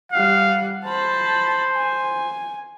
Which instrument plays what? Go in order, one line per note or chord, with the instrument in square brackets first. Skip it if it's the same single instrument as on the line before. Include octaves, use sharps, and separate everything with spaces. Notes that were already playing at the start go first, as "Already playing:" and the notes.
[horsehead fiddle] G3 F#5 [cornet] F5
[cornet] C5 [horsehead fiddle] A5 B5
[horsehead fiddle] G#5